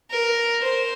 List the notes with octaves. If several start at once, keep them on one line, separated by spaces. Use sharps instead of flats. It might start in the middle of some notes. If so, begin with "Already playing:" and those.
A#4
C5